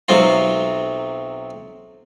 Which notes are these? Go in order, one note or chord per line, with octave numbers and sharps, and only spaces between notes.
B1 C3 F#3 C4 F4